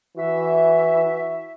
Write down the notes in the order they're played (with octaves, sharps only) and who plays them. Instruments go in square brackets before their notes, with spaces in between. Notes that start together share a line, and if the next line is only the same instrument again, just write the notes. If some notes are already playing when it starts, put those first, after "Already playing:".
[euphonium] E3 [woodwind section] F#4 E5